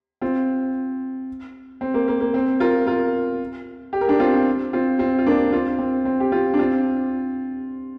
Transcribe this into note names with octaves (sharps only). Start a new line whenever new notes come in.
C4 F4
C4
A#3
A#3
A#3
C4
F4 A#4
F4 A#4
G4
A#4
D4 G4
C4 F4
C4 F4
C4 F4
F4
A#3 D4
C4 F4
C4
C4
G4
C4 F4
D4
C4 F4